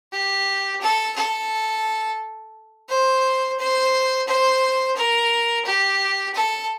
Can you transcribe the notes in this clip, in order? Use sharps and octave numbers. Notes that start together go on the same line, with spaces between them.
G4
A4
A4
C5
C5
C5
A#4
G4
A4